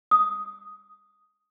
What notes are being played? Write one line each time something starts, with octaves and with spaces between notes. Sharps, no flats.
D#6